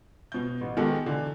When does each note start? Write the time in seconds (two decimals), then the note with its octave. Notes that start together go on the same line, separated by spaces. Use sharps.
0.32 B2 G6
0.61 A1
0.77 D#3 G#3 B3 F#4 G4 A4
1.06 D3 E3